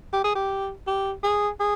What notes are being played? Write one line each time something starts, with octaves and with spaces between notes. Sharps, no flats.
G4
G#4
G4
G4
G#4
G#4